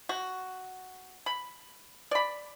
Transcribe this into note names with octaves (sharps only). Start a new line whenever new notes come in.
F#4
B5
D5 B5